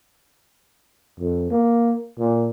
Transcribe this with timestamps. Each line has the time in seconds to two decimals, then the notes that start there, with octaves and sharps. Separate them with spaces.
1.19 F2
1.51 A#3
2.19 A#2